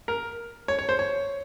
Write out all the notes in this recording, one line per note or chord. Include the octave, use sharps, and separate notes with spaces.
A#4
C#5
C#5
C5
C#5